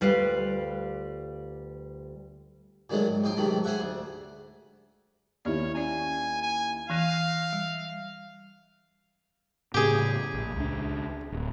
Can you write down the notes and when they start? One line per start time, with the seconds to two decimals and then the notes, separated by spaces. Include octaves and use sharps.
0.01 D2 G3 F4 B4 F5
2.90 A#2 D#3 F#3 G#3 A3
3.07 G#2
3.24 A#1 D#4 G5 C6
3.37 G#2 C3 D#3 F#3 A3
3.64 G#4 C5 E5 F#5 C#6
3.80 D2
5.45 D#2 D#4 E4 G4 C#5 D5
5.75 C#4 D5 G#5
6.43 G#5
6.90 E3 F5 F#6 A#6 D#7
7.53 G3
9.74 A2 C#3 G4 G#4
10.34 A#1
10.56 C#2 D4
11.32 D1